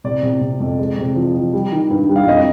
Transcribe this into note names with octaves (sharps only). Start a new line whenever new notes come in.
C3 D5
C3
C3
F2
G#3
C3
F3
F3
G3
D#3
G2
G3
F5
F2 D#5